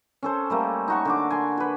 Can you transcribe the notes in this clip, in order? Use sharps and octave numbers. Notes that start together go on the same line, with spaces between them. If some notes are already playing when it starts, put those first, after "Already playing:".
C#4 A4 C5
G3 A3 A#3
D#4 F#4 C#6
D3 D4 D6
G#5 C6
F#4 B4